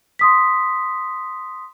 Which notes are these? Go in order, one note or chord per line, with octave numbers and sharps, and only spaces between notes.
C6 D#6 B6